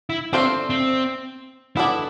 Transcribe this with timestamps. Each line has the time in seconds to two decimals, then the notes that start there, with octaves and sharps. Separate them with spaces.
0.10 E4
0.33 A3 C4 D4 F4 A4 C5
0.70 C4
1.76 B3 D4 E4 A4 D5